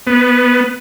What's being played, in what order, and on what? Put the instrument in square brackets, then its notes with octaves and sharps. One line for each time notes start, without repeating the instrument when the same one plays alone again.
[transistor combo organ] B3